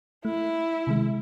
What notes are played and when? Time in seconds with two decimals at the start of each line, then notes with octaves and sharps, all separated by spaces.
0.25 A3 E4
0.87 C3 D#3 G#3